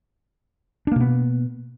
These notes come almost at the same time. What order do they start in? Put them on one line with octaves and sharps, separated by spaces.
D4 A#3 B2 B3